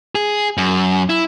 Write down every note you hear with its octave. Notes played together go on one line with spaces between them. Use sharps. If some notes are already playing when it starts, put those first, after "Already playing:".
G#4
F#2
E4